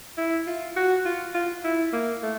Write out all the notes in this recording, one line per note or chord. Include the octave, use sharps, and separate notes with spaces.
E4
F4
F#4
F4
F4
E4
A#3
A3